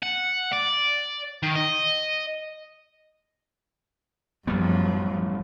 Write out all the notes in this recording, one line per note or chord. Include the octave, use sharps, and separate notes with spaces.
F#5
D5
D#3
D#5
A1 F#2 F3 G3 B3